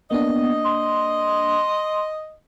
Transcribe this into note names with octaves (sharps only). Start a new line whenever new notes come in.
A#3 B3 D4 D#5
C6